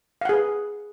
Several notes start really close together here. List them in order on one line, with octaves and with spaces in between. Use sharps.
F5 F#5 G#4 B4